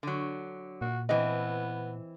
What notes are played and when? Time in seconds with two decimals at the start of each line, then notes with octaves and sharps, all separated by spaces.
0.03 D3 F#3
0.81 A#2 F#4
1.09 E3 B3 C4 D#5